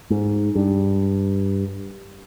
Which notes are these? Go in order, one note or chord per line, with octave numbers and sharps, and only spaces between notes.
G#2
G2